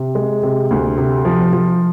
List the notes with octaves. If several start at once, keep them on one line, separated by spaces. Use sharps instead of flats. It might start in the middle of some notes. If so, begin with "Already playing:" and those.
Already playing: C3
G#3
C3
D2
C3
F3
F3